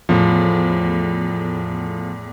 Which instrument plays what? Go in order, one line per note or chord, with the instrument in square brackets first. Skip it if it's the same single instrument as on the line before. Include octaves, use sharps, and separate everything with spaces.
[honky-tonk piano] E2 A2 [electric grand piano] F3